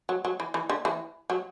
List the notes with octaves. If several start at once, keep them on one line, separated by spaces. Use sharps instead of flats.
F#3
F#3
E3
E3
D3
E3
F#3